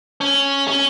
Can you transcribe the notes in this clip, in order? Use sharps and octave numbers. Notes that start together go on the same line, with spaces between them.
C#4
C#4